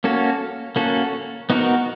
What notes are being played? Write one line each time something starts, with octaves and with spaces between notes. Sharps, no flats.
A#3 C#4 F#4 A4
A#3 C#4 F#4 A4
B3 D#4 F#4 A#4